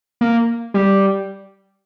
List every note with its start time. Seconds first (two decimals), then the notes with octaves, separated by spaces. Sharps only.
0.21 A#3
0.74 G3